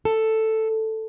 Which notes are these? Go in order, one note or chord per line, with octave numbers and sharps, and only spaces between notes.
A4